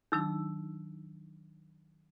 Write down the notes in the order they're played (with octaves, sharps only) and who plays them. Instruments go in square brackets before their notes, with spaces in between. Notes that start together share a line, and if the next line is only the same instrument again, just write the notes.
[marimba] D#3 F#3 D4 [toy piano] D#4 E6